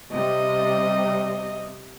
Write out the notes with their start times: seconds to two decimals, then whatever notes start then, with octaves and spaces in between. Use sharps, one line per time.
0.12 C3 G3 D#5